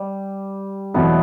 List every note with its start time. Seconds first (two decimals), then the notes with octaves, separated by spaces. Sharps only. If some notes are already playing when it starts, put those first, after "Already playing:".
Already playing: G3
0.94 E2 B2 F#3 A3 B3 E4